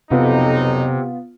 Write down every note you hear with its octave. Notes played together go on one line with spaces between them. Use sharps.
B1 F2 C3 B3 D#4 F4